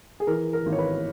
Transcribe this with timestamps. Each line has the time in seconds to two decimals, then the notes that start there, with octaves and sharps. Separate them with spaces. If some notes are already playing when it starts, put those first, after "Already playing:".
0.20 G#4
0.27 E3 A#4
0.53 A#4
0.66 G#1
0.72 C#5
0.79 B4